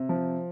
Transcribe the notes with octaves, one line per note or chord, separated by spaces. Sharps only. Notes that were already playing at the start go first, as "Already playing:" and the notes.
Already playing: C3
F3